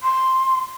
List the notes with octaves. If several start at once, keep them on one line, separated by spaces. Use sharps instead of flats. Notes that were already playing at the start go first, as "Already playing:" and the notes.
C6